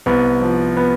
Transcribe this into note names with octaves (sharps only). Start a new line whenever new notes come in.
C2 B3
F3
B3